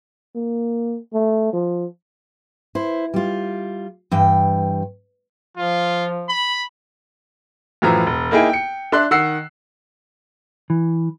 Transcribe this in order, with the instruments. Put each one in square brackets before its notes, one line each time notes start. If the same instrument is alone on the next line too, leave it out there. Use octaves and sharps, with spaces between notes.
[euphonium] A#3
A3
F3
[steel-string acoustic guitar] E4 C5
G3 F4
G2 E3 G5
[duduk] F3 [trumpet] F4
[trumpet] B5
[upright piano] F#2 A2 E3 F3 A#5
E1
A#3 D#4 E4 G#4 G5
G5 C#7
D4 E5 C6 F#6
D#3 F#5 E6 C7
[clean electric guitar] E3